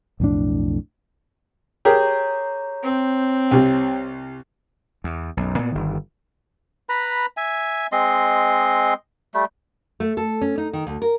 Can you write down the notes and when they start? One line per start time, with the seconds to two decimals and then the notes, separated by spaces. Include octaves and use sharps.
0.20 B1 F2 A2 D4
1.85 G4 G#4 A#4 C#5 A#5 G6
2.83 C4
3.51 C2 C3
5.04 E2
5.37 B1 F#2
5.58 A#2 B3
5.72 G1 D#3
6.89 B4 A#5 B5
7.37 E5 G#5
7.92 G#3 C4 D#5 C6
9.34 G3 A3
10.00 A3
10.17 A4
10.41 C#4
10.58 D#4
10.73 D#3
10.87 D2
11.02 A#4